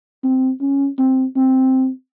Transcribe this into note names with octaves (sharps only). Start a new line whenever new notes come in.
C4
C#4
C4
C4